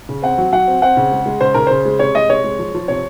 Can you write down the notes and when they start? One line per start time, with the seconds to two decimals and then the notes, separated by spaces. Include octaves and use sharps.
0.09 C#3
0.22 C4 F#5
0.38 F#3
0.53 F#3 F#5
0.67 C4
0.82 C4 F#5
0.97 C#3
1.12 G#3
1.26 G#3
1.41 C#3 C5
1.54 C#3 A#4
1.67 C#3 C5
1.85 G#3
1.99 C3 C#5
2.14 G#3 D#5
2.30 C3 C#5
2.44 G#3
2.59 F3
2.74 F3
2.88 C3 C#5